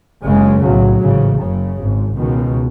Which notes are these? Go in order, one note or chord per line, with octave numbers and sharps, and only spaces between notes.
F#1 F#2 C#3 G#3
B1 A2 F#3
A1 G#2 C#3
F#1 F#2 C#3
G#1 G#2
C#2 B2 D#3